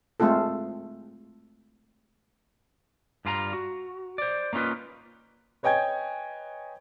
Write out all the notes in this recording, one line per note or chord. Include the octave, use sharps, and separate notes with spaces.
G#3 A3 C4 F4 A4
G2 G3 F4 A5 A#5
F#4
C5 D5
A#3 C#4 D#4 F4 B4
B4 C#5 D#5 G5 G#5 G#6